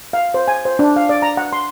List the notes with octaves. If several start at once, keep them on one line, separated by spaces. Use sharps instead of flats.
F5
C5
G#5
C5
D4
F5
D5
A#5
F#5
C6